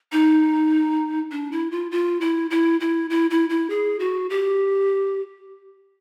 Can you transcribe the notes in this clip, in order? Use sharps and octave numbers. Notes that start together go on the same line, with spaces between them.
D#4
D4
E4
F4
F4
E4
E4
E4
E4
E4
E4
G#4
F#4
G4